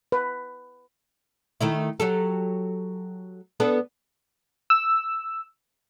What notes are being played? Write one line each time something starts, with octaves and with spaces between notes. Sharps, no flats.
B4
D#3 A3 E4
F#3 G4 A4
B3 D4 A4
E6